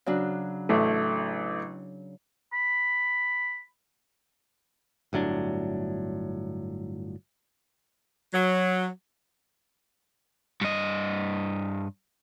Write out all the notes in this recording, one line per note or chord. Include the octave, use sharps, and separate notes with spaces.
C#3 F#3 D4
A1 A3
B5
G1 A2 F#3 D4
F#3
G2 D#5